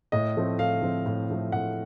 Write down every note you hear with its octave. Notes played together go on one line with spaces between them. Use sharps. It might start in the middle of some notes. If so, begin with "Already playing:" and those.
A2 D#5
F3 A3 C4
A2 F5
F3 A3 C4
A2
F3 A3 C4
A2 F#5